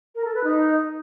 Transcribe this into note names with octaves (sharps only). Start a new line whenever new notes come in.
A#4
A4
B4
D#4